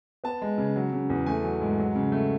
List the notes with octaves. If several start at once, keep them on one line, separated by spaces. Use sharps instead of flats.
B3 A5
G#3
C#3
F#3
C#3
E2
A3 G#5
F#3
G#2
F#3
C#3
A3